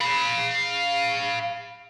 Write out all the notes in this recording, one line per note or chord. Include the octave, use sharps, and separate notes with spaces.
F5 B5